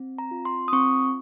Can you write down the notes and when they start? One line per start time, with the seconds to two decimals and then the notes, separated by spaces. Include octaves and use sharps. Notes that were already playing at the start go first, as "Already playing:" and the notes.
Already playing: C4
0.18 A#5
0.31 F4
0.45 C6
0.68 D#6
0.72 C4 C#6